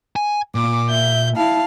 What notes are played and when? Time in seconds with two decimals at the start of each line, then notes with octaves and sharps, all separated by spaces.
0.16 G#5
0.55 A#2 D6
0.89 E5 G6
1.36 E4 F5 A5